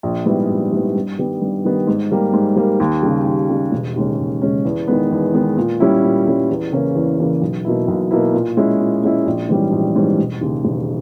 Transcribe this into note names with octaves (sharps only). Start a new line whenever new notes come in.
A#1
G#2 G3 B3 E4
A#1
G#2 G3 B3 E4
G2
D#3 G3 B3
G2
D#3 G3 B3
G#2
G3 A#3
G#2
G3 A#3
D#2
C#3 G3
D#2
C#3 G3
E1
D#2 C#3 G#3 C#4
E1
D#2 C#3 G#3 C#4
E2
D#3 G#3 B3
E2
D#3 G#3 B3
A#2
G3 C#4 E4
A#2
G3 C#4 E4
E2
C#3 E3 A#3 C#4
E2
C#3 E3 A#3 C#4
B1
B2 A#3 E4
B1
B2 A#3 E4
A#2
G#3 C#4 E4
A#2
G#3 C#4 E4
A#1
G#2 E3 G3 C#4
A#1
G#2 E3 G3 C#4
E1
D#2 C#3
E1